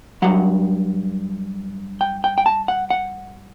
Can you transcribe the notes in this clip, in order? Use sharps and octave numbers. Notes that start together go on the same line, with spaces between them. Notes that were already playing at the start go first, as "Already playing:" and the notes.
G2 F#3 F#5
G5
G5
G5
A5
F#5
F#5